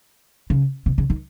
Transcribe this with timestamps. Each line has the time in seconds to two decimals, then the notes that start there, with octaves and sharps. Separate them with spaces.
0.50 C#3
0.86 C3
0.98 C#3
1.10 D#3